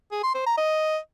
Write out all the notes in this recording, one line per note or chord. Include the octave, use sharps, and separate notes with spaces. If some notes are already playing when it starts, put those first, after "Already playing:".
G#4
C6
C5
A#5
D#5